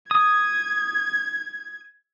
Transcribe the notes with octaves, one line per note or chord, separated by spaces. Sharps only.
D#6 G#6